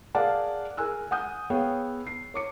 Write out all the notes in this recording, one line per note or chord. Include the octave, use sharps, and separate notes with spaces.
G#4 A#4 D5 F5 F#5 A5
G#4 A#4 G#5 E6 F#6
F#5 G#5 D#6 G6
B3 G#4 C#5 F5 G5
C7
C#5 D6 C#7